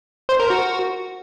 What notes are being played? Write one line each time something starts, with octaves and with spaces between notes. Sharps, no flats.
C5
A#4
F#4